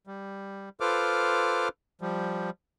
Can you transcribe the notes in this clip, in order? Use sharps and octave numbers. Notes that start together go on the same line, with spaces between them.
G3
F4 A4 B4 C5 D6 F6
F3 G3